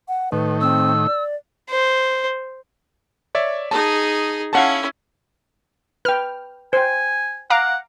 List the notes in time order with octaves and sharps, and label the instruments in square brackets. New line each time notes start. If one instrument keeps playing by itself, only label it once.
[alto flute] F#5
[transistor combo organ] A2 D#3 [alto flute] B4
[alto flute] C4 [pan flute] E6
[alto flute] D5
[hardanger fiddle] C5
[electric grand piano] C#5 D5 E5
[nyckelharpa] D#4 G#4 [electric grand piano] A5
[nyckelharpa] C#4 E4 [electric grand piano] F5 F#5 A5
[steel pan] B4 G5 [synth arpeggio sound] F6
[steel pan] C5 G5 [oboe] G#5
[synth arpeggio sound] F5 A#5 D6 [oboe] F#5